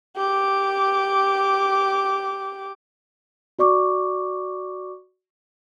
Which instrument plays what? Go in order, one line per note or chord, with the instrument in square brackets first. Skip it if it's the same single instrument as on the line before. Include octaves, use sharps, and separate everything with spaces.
[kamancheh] G4 D6
[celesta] F#4 D5 C#6 D6